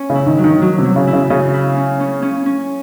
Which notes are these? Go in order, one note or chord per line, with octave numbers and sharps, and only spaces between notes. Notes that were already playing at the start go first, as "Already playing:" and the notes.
Already playing: C#4
C#3
E4
D#3
F#3
D#3
F#3
C3
F#3
C#3
E4
C#3
C#3 C#4
E4
C#4
C#4
C#4
C#4